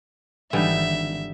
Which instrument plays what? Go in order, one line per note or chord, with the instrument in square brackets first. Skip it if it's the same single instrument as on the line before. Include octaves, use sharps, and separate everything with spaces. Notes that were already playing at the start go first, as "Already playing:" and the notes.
[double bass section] G#1 [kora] D3 G3 D#4 [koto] E3 [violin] E5